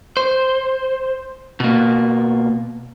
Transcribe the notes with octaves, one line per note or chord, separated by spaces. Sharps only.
C5
B2 A#3